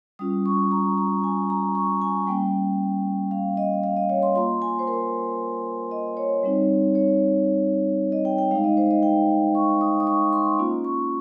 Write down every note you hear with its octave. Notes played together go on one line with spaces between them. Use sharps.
G3 C#4 F4 D#6
C#6
A#5
A#5
G#5
A#5
C#6
G#5
G3 A#3 C#4 G5
F5
D#5
F5
D#5
C#5
C6
A#3 F4 C6
G#5
C5
A#4
D#5
C#5
G3 C4 D#4
C#5
D#5
G5
G5
G#3 D#4 F5
D#5
C5
D#5
G5
C#6
D#6
D#6
C#6
C6
A#3 C#4 F4
C#6